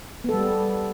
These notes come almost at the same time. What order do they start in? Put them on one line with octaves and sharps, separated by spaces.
B3 A4 G3